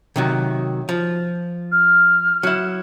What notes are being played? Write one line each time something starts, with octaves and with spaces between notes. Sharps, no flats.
C3 D#3 F#3
F3
F6
F#3 E4